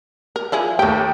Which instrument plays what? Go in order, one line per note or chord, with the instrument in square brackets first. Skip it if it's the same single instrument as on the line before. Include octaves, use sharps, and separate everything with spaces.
[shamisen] A#4
F3 E4 G#4
[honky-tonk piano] D#2 G5 [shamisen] A3 G4